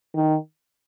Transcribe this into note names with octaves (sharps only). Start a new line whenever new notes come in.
D#3